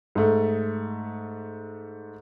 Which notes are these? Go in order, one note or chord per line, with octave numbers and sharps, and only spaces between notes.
G#2 A3